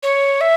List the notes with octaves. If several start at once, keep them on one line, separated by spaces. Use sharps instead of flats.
C#5
E5